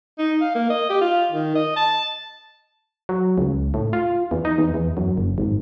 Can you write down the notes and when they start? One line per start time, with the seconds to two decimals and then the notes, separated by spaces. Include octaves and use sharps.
0.18 D#4
0.41 F5
0.55 A#3
0.70 D#5
0.90 G4
1.01 F4
1.32 D#3
1.55 D#5
1.76 A5
3.09 F#3
3.38 C#2
3.74 A2
3.93 F4
4.31 E2
4.45 D#4
4.58 E2
4.74 E2
4.97 F#2
5.17 F#1
5.38 G#1